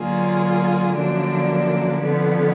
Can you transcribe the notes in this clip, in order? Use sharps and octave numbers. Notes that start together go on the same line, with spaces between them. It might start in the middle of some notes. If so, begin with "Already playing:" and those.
Already playing: D3 F#3 A#3 F4 G#4
F#2 D3 F3 A#3 D4
F2 D3 F3 B3